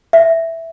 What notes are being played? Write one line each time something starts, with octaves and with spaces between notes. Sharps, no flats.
E5